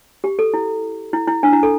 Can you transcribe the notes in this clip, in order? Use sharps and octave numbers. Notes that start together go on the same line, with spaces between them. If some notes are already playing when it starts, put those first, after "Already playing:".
G4
A4
E4
E4
E4
D4
E4
A4